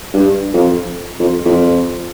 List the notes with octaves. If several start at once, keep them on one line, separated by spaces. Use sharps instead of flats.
G2
F2
F2
F2